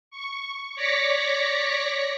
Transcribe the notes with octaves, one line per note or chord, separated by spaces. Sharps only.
C#6
C#5 D5 D6 A#6 B6 C#7